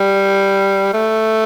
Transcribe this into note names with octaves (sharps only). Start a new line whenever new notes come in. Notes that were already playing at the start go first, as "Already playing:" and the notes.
Already playing: G3
A3